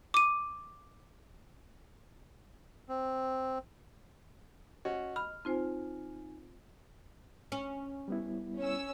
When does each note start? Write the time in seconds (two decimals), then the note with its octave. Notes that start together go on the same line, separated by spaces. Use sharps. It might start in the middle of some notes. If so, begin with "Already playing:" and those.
0.14 D6 D#7
2.89 C4
4.85 C#4 F#4 D#5
5.16 B5 F6
5.45 C4 D#4 F4 C5 G#5
7.52 C#4
8.08 G3 B3 E4
8.59 C#4 E6